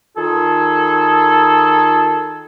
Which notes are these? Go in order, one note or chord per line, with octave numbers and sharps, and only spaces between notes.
D#3 F4 G#4 A4